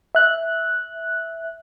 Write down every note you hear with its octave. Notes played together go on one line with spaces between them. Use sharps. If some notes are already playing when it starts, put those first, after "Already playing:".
E5 F#6